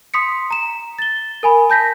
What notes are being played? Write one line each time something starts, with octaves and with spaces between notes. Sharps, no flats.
C6 D#6 B6 C#7
A#5 E7
A6 G7
A#4 G#5 B5
A5 G6 A#6 B6